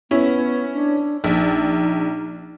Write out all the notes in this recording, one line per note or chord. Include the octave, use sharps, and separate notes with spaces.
B3 C#4 E4
D4
A#1 D#4